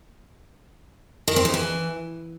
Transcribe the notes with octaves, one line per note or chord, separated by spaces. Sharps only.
D#3
C4
C#3
E3